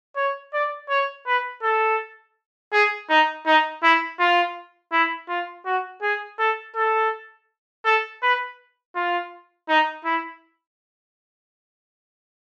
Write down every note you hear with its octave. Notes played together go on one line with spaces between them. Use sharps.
C#5
D5
C#5
B4
A4
G#4
D#4
D#4
E4
F4
E4
F4
F#4
G#4
A4
A4
A4
B4
F4
D#4
E4